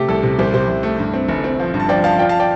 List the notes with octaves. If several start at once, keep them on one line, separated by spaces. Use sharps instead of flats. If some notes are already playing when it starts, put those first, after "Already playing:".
Already playing: C3 A3 G4
C2 A4
C3
C2 G4 C5
C3 G4 C5
C2
A3
G2
C4
G1
C4
F3
G2
A5
F3 D5 G5
F3 F5 A5
F4 D5 G5
F5 A5
D5 G5